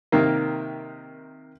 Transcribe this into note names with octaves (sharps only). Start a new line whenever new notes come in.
C3 D#3 A#3